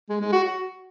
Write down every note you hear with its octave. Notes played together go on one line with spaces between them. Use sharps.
G#3
G#3
F#4
F#4